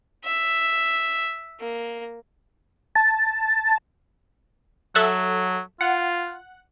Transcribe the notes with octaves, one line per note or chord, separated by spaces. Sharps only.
E5
A#3
A5
F#3 A4 E5 F#5
F4 F#5